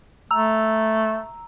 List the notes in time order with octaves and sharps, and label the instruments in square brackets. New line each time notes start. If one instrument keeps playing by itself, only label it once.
[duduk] A3 [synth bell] A#5 E6